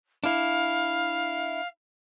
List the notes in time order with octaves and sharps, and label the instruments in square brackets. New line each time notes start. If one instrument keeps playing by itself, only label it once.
[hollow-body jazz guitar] D4 E4 [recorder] F5